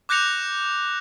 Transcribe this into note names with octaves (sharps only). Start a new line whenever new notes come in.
D6 F#6 G6 A#6 C#7 F7